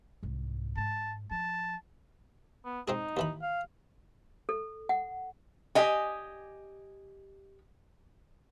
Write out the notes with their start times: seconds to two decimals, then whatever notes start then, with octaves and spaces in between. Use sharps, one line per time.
0.23 C2 G#2
0.77 G#2 A5
1.31 F3 A5
2.65 B3
2.88 G#3 C4 D#4 G#4
3.17 D#2 E3 B5
3.42 F5
4.49 A4
4.89 F#5
5.75 G4 D#5 G#5